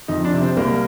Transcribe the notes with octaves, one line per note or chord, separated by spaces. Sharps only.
F2 D#4
D4
C3
C4
C2 A#3